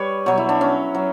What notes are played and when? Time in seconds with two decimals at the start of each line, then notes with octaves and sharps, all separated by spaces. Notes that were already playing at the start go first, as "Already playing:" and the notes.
Already playing: G3 B4 C#5
0.26 B2 F#3 C#5
0.38 E4
0.49 D4
0.61 C#4
0.95 F#3